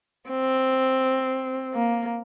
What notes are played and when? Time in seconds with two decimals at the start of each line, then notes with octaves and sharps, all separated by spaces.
0.29 C4
1.74 A#3